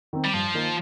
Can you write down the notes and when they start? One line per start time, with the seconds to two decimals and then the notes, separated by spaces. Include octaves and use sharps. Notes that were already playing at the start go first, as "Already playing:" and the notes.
0.13 D#3 C4
0.24 G3
0.33 G2 F3
0.54 D#3 A#3 D#4